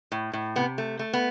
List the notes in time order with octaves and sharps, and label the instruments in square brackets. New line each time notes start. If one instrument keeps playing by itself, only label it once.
[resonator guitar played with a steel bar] A2
A2
C3 B3
A3
A3
B3